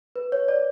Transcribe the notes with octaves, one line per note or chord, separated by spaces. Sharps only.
B4
C#5
D5